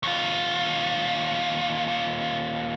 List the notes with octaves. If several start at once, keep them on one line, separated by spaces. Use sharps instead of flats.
D#2 F4